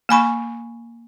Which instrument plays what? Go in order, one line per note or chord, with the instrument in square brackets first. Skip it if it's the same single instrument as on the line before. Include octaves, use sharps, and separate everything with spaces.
[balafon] A#3 G#5 B5 C#6